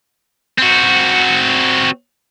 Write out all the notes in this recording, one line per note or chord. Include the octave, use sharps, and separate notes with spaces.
C4 F#4